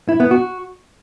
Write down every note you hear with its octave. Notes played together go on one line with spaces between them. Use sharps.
E4
B3
F#4